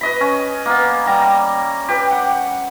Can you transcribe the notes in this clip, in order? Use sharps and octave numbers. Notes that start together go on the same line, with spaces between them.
B4 D#5 B5
C#4
A#3 B3
G3 A#5
G4 B4
F#5